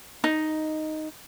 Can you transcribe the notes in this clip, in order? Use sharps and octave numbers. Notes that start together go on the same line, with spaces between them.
D#4